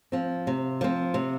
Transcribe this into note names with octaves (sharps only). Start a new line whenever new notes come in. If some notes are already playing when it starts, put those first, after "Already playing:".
F3 C4
C3
F3 C4
C3